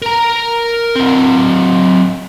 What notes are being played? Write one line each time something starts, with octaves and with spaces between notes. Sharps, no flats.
A#4 A#5
F#3 C4